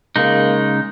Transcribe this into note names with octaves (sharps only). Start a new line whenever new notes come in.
C#3 G#3 A#3 D#4